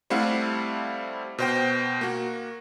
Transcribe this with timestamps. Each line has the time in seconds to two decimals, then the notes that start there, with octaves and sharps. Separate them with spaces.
0.10 G3 A3 C4 E4 F5 F#5
1.38 B2 C5 G5
2.01 A#3 F#4